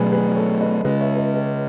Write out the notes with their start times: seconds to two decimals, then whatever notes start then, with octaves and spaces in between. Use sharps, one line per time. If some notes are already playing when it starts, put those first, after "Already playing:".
Already playing: B2 F#3 A3 G#4 B4
0.12 G#4 B4
0.36 A4 C#5
0.60 B4 D#5
0.85 C#3 G#3 C#4 B4 D#5
1.01 C#5 E5
1.17 B4 D#5
1.34 B4 D#5